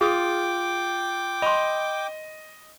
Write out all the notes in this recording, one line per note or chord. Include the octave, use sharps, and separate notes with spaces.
F4 G#4 G5 D6 D#6
D#5 B5 C6